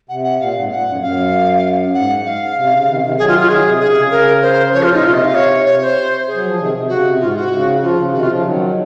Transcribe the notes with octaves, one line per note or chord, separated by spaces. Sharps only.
C3 F#5
F#5
A#2 F5
G#2
A#2 F#5
F#2
F#2 F5
G#2 F#5
F5
C3
C#3
C3 D#3
C3 D#3
D#3 F#3 G#4
F4
F4
D#3 F#3 G#4
C3
C#3 G#4
C3
C#3
A#4
C5
C#3 F3 C#5
F4
A#2
D#4
C3 F4
D#5
F5
C#5
C3 C#5
C5
G#4
F#3
F3
C3 D#3
C3
C#3 F#4
C3
G#2 F4
F#4
C#3
C#3 F3 F4
C#3
C3 D#3 F#4
F4
C#3 F3
D#3 F#3